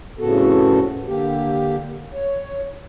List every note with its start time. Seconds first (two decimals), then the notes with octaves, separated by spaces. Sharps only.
0.19 F2 A2 C#3 B3 F#4 A4
1.07 D3 A#3 G4
2.13 C#5